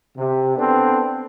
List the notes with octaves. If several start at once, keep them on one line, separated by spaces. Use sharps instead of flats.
C3
B3 C4 D4 A4